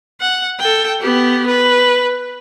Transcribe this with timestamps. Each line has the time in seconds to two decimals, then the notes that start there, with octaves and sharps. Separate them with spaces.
0.20 F#5
0.59 A4 G5
1.01 B3 G4
1.47 B4